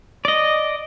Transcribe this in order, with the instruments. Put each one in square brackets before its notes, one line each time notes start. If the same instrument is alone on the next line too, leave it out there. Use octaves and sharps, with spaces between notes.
[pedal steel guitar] D5 D#5